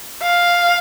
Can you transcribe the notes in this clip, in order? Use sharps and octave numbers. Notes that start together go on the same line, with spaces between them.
F5